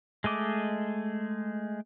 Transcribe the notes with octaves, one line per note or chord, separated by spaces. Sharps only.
G#3 A3 D#5 D6